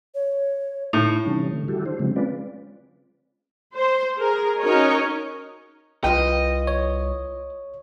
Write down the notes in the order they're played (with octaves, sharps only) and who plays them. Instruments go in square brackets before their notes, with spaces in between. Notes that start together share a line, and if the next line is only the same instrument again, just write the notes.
[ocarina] C#5
[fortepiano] A2 [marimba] D#4
[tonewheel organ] C3 E3 G3 C#4
D3 A3
D#3 G3 E4 F#4 G4 A4
D4 C5
C#3 F3 F#3 G#3 C4
G#3 C4 C#4 F4 B4 D5
[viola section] C5
G#4 A#4
C#4 D#4 F#4 A#4 C#5 D#5
[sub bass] C2 [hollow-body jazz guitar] F4 B4 G5 [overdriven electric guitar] D#5
[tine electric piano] C#5